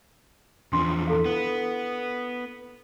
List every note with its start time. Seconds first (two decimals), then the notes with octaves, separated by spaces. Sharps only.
0.73 E2 F3 D4 C6
1.07 E4 A4 F5
1.26 B3